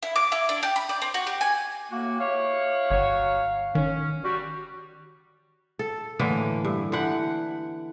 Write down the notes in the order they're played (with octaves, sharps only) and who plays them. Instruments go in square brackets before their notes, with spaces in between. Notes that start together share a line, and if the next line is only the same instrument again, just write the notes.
[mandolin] E4
D6
E4
D4
G4
B5
D5
C4
F#4
G4
G#5
[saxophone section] A2 F#4 [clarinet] A#3
[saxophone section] E4 G4 C#5 [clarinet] F5
[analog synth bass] G1 [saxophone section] F#3 C#5
[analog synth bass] D#3 [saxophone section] C#4
[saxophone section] G3 [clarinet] F#4
[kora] A4
A2 D3 E3 A#3
G2
D3 E3 F#5 G5